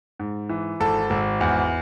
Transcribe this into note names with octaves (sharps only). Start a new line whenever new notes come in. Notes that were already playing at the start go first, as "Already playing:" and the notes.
G#2
E3
G#1 A4
G#1
E2